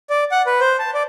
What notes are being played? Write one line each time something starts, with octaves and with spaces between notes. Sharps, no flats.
D5
F#5
B4
C5
A5
D5